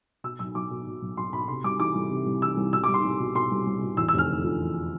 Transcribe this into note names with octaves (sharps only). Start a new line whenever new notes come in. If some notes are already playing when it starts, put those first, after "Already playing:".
B2 E6
B1 E6
B1 D6
B2
B2
B1
B1 C6
B2 B5
C3 C6
C2 D6
E3 D6
C2
C3
C2
E3 E6
C2
B2 E6
D6
C2
C6
C2
B2
B2 C6
C2
C2
B2
E2 E6
F1 E6
F6
D3
F3
E2